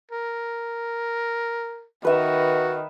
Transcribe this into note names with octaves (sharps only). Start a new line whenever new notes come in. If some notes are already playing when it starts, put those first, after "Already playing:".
A#4
D#3 F#4 B4 E5